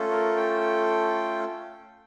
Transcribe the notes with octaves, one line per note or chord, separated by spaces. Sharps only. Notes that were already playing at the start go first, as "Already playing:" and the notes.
Already playing: A3 C#4 F4 A4
A#4
G5